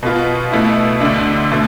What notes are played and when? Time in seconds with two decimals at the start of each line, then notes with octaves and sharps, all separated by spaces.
0.03 B2 B3 F4
0.52 B2 A3 E4
1.00 D2 D3 A3 D4
1.51 B2 A3